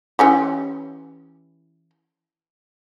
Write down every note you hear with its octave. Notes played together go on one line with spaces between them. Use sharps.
E3 C#4 G4